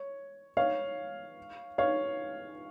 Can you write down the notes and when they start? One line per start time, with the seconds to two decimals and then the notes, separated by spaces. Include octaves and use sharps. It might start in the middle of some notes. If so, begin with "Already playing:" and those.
Already playing: C#5
0.57 C#5 F5
1.78 C#5 F5